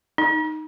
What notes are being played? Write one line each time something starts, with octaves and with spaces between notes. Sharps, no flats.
D#4